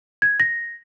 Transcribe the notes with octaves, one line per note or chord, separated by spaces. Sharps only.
G#6
A#6